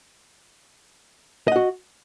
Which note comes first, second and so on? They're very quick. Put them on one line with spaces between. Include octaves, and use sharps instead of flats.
D#5 F#5 F#4